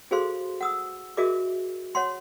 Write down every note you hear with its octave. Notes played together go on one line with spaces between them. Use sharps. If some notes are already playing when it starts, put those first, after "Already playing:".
F#4 G#4 A4 C5 F5 C6
F#5 D#6 E6
F#4 G#4 A#4 D#5 E5 D6
C#5 F#5 C6